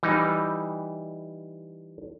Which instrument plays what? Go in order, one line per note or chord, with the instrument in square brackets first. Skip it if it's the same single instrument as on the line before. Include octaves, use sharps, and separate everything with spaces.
[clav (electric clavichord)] E3 G3 D#4